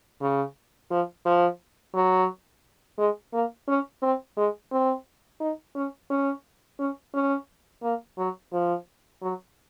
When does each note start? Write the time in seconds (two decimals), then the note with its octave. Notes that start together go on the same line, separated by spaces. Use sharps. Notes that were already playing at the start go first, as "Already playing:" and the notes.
0.21 C#3
0.91 F3
1.25 F3
1.95 F#3
2.98 G#3
3.33 A#3
3.68 C#4
4.02 C4
4.37 G#3
4.72 C4
5.41 D#4
5.76 C#4
6.10 C#4
6.79 C#4
7.14 C#4
7.83 A#3
8.18 F#3
8.53 F3
9.22 F#3